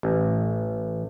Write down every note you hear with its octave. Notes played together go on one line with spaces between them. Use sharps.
A1